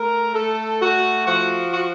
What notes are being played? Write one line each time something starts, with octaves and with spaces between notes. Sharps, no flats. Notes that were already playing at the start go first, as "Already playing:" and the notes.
Already playing: A3 A#4
A3 A4
A3 F#4
F3 F#4
F#4